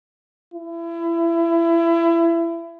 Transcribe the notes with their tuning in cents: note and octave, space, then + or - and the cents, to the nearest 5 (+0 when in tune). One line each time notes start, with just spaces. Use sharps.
E4 +25